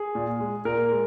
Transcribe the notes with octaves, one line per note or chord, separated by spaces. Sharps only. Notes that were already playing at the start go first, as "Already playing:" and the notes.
Already playing: G#4
A#2
G#3
A#2 A#4
G#3